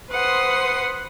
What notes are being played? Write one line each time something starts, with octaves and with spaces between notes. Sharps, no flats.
B4 C5 F#5 C6 D#6